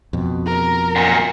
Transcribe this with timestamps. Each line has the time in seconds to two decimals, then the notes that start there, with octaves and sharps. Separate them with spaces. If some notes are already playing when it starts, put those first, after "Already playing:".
0.13 F2 B2
0.46 A#4
0.96 F#2 A#2